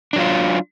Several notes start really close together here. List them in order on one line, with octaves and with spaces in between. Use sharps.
D4 F#3 F4